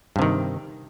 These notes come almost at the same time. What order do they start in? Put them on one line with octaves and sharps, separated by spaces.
G2 C3 D#3